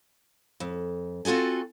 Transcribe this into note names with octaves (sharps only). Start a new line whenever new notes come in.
F2
C4 F4 F#4 A4 G#5